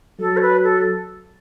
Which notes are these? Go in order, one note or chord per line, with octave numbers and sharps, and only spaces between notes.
F#3 A4
C#5
B4
A4